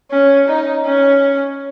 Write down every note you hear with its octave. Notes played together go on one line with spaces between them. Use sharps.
C#4
D#4
C#4